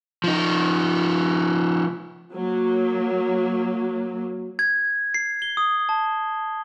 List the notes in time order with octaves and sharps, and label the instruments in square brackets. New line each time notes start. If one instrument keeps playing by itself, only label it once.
[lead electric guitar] F3 D#4
[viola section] F#3 A#3
[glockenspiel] G#6
C7
G7
D#6
A5